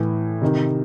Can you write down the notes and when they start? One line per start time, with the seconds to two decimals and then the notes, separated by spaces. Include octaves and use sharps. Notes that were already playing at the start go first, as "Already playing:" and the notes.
Already playing: A2 E3
0.42 C3 D#3